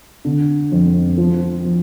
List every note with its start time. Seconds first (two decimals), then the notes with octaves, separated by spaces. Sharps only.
0.25 D3
0.72 F2
1.17 F3
1.65 F3